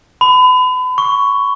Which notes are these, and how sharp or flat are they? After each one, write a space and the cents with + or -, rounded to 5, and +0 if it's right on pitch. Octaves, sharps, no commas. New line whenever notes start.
B5 +35
C#6 +10